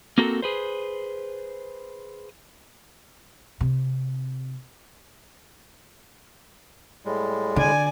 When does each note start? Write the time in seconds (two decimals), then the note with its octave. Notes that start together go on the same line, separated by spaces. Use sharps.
0.18 A#3 C4 F#4 A4 A#4
0.42 G#4 B4 C5
3.61 C3
7.05 A2 G3 G#3
7.56 D3 D5 G#5